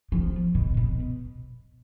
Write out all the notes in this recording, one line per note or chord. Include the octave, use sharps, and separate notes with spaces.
F3
B2
B2